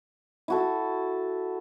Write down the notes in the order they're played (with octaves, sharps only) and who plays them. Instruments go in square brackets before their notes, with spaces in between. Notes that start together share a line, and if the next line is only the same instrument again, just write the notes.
[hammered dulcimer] E4 F#4 A4